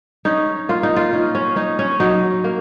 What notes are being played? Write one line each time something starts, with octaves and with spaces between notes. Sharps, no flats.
C#4 D#4
A#3 F4
D#4
F4
C#4 D#4
C#4
C#4 D#4
C#4
F#3 D#4
A#3